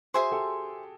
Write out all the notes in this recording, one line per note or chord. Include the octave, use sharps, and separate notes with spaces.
F#4 G#4 C5 E5 G#5 C6
G4 A4